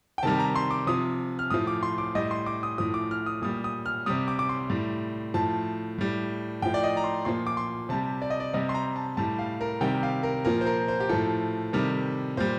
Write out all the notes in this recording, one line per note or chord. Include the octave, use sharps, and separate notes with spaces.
G5
C3 D#3 G3 A5
A#5
C6
D6
C3 F3 D#6
F6
A2 F3 D#6
D6
C6
D6
A2 G3 D#5
C6
D6
D#6
A2 F3 D#6
D6
F6
D#6
A#2 G3 D#6
D#6
F6
C3 G3 D#6
D6
D6
C6
A2 G3
A2 F3 A5
A2 G3
A2 F3 G5
D5
D#5
A#5
C6
A#2 F3 C6
D6
C6
C3 G3 A5
D5
D#5
D5
C3 G3 D#5
C6
A#5
A5
A2 G3 A5
F5
A#4
C3 D#3 G3 G5
F5
A#4
A#2 F3 A#4
C5
A#4
C5
G4
A2 F3 A4
C3 D#3 G3
A#2 G3 C5